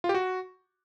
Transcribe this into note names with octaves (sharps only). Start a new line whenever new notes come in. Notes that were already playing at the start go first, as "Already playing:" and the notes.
F4
G4
F#4